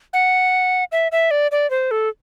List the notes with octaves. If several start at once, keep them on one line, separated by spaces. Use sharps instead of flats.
F#5
E5
E5
D5
D5
C5
A4